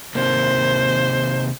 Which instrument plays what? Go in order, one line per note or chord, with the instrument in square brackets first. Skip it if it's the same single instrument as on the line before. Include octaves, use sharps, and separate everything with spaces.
[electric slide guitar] C3 D#3 A#3 [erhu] C5